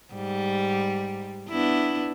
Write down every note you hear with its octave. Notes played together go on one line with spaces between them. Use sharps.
G#2 G3
B3 D4 E4